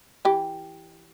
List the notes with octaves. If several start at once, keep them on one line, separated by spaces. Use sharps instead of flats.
E3 G4